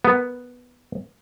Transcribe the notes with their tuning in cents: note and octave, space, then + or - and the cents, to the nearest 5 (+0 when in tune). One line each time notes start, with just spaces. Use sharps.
B3 +0 A#4 +0